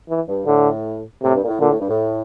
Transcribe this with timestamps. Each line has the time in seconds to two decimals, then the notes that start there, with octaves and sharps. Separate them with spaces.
0.09 E3
0.28 G2
0.46 A2 D3
1.22 A2 C3
1.35 G2
1.43 A#2
1.48 A2
1.60 A#2 D3
1.70 A2
1.79 G2
1.89 A2